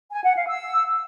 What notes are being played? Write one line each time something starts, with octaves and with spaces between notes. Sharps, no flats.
G#5
F#5
F5
E6